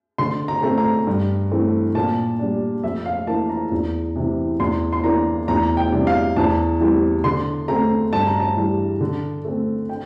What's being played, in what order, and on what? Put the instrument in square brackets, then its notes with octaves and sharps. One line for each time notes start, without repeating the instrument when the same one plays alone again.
[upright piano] D3 C6
A#5
A3 C4
A#5
G2
E3 A3 C4
A#2 A5
G3 D4
F2 E5
F5
E3 A#3 A5
A#5
E2
C3 E3
E2 C6
C6
E3 A#3 D4 A#5
E2 A#5
G5
C3 G3 D4
F5
E2 A5
E3 G3 C4
D3 C6
A3 C4 A#5
G2 A5
A#5
A5
E3 G3
D3
A3 C4
G5